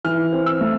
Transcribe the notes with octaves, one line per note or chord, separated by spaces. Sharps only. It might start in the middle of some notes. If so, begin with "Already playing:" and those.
E3 F6
C4
E6
A3